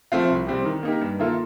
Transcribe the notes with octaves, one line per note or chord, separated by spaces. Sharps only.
F3 A3 C4 F4
C2
C3 G3 C4 G4
D#3
A#3 D#4 G4
G2
D#3 A#3 F4 A4